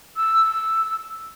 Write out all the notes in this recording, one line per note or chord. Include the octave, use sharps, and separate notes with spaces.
E6